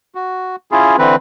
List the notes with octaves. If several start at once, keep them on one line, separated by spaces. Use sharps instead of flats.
F#4
C#4 E4 F4 G#4
D3 E3 C4 B4